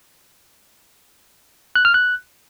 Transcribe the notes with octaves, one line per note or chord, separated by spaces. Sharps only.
F#6
F6
F#6